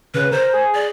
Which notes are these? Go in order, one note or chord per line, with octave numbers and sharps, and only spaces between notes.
C#3 B4
A#4 C5
G#4
D5